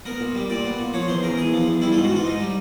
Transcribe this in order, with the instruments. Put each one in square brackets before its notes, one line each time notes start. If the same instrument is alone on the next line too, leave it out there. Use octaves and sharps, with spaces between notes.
[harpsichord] B3 A#4
A#2
G3
A#2 D5
B3
A#2
F3 C#5
E2 C5
C#3 A#4
E2 G#4
F3
E2
G3 E4
F4
G#2
F#4
E3 F4
G#2 D#4
G3